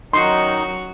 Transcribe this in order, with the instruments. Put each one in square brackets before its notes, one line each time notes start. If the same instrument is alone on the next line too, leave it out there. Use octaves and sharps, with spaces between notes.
[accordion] D#3 D#4 D#5 [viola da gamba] F#3 C#4 F#4 [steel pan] C6